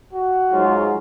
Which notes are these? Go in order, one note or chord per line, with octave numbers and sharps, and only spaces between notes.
F#4
G#2 F#3 F4